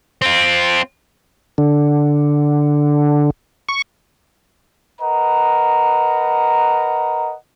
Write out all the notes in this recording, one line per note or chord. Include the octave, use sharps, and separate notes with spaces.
C4 F4
D3
C#6
A#4 B4 D#5 F#5 A#5